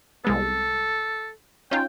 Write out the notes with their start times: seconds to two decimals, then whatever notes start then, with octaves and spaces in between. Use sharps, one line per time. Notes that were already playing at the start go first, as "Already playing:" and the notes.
0.24 C2 G#3 B3 A4
1.71 C#4 D#4 F4 G5